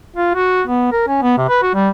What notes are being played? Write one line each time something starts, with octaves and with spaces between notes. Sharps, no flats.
F4
F#4
B3
A#4
C#4
B3
C3
B4
F#4
G3